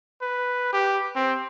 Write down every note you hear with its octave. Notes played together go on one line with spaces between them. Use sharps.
B4
G4
C4